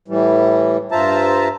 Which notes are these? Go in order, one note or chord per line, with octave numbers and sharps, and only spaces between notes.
A2 E3 G3
G2 F4 C5 E5 A5 A#5